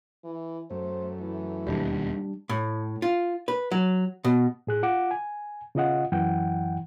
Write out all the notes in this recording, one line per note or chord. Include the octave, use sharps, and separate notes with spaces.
E3
F#2 A3 C5
E3
E1 D#2 G3 D4
A2
F4
B4
F#3
B2
A2 G#4 F#6
F4 F#5 D6
G#5
C#3 F4 D#5 F#5
F#2 E3 F#5 G5